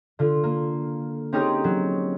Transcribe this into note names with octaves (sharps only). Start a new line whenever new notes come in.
D3 F4
A#3
C4 C#4 D#4 G4 G#4 A#4
F#3